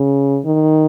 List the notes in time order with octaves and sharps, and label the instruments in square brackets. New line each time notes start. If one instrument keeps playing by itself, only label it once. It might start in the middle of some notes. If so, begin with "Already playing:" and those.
Already playing: [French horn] C#3
D#3